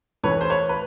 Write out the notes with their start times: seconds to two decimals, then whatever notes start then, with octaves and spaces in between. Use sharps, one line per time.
0.23 A2 E3 B4 C#5
0.41 C5
0.50 B4 C#5
0.69 B4